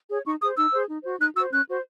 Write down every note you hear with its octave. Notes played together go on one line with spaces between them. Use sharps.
G#4 C#5
D#4 C#6
G#4 C5 D#6
D#4 E6
G#4 C5
D#4
F#4 C5
D#4 F#6
F#4 C5 E6
C#4 F#6
F#4 C5